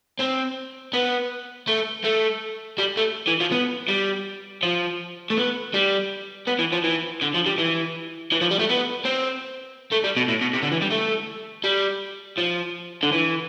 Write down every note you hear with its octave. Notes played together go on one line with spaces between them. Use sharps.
C4
B3
A3
A3
G3
A3
E3
F3
B3
G3
F3
A3
B3
G3
B3
E3
F3
E3
D3
F3
G3
E3
E3
F3
G3
A3
B3
C4
A3
G3
B2
A2
B2
C3
D3
E3
G3
A3
G3
F3
D3
E3